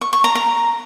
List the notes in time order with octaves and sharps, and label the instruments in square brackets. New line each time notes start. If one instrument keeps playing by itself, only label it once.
[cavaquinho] C#6
C#6
A#5
A#5